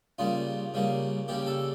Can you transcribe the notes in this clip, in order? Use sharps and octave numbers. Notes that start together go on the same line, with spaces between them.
C#3 G3 A#3 F4
C#3 G3 A#3
C#3 G3 A#3 G4
A4